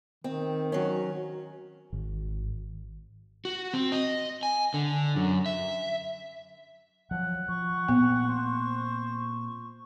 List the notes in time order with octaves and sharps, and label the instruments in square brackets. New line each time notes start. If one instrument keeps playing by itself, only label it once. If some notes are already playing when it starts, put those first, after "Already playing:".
[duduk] D#3 [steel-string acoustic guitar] C4
[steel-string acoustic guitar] F#3 C#4
[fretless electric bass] G#1
[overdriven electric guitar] F#4
C4
D#5
G#5
D3
F#2
E5
[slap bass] F3 F#3 [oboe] F#5
[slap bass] F3 [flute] C#6
[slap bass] A#2 C4 [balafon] B3
[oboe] C5